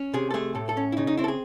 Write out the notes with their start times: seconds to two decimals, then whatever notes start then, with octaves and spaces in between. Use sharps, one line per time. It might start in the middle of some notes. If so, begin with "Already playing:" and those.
Already playing: C#4
0.14 C3 G#4
0.31 A4
0.34 A3 G#4
0.55 A2 A4
0.69 A4
0.77 C#4
0.92 E4
0.97 C#3 D#4
1.07 D#4
1.17 C4 E4
1.24 A4
1.28 G#4